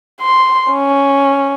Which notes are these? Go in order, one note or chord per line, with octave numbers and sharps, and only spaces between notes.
C6
C#4